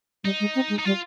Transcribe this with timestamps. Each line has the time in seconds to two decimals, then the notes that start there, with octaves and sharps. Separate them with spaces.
0.24 G3 D#4
0.40 G#3
0.55 C4
0.70 G#3
0.79 D#4
0.85 G3 F4